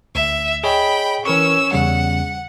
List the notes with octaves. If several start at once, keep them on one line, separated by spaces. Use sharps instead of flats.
D2 E5
G#4 C#5 D#5 G5 B5
E3 C#4 A#4 C#6 E6
E2 C#3 G3 F#5